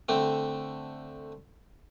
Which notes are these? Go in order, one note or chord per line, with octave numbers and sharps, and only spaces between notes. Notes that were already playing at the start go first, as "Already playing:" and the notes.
D3 A3 C4